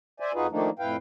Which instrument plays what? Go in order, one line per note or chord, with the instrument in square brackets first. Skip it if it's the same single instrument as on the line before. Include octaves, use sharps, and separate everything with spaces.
[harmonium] C5 D5 E5 G#5
F2 D#4 F4 F#4 G#4 B4
D#3 F3 A3 A#3 D4 D#4
F2 A2 E4 B4 F5 G5